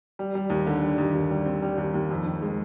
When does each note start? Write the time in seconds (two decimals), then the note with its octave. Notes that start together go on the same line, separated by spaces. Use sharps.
0.19 G3
0.35 G3
0.50 D#2
0.67 D3
0.82 G3
0.98 D#2
1.14 D#2
1.31 G3
1.45 C4
1.62 G3
1.78 D#2
1.94 D#2
2.10 F2
2.26 D#3
2.42 G#3